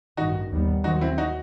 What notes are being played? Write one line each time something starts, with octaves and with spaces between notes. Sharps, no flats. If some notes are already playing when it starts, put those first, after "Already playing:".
A1 G2 D#3 D#4 F#4
D#2 D#3 G3 B3
D#2 D#3 F#3 C4 D#4 F#4
C4 E4
D#4 F#4